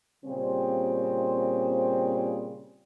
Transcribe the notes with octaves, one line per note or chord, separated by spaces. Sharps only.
A#2 C#3 G3 C4